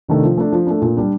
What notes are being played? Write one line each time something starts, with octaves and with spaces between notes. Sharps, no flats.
C3 D#3 A3 D4
F3
A3 D4
F3
A3 D4
A#2
G3 D4